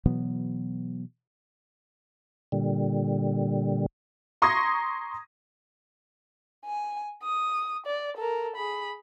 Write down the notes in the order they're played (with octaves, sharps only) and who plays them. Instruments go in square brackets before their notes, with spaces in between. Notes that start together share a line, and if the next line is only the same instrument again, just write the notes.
[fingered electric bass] B2 E3 F#3 B3
[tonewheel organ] A#2 D3 G3
[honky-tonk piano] A#5 C6 C#6 D#6 G#6 A#6
[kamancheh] G#5
D#6
D5
A4 A#4
G#4 B5